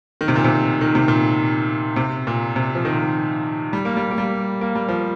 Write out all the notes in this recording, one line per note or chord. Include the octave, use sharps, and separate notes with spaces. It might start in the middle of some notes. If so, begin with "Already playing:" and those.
D#3
C3
A#2
C3
D#3
C3
A#2
C3
A#2
C3
F3
D#3
G3
A#3
G3
A#3
G3
A#3
G3
F3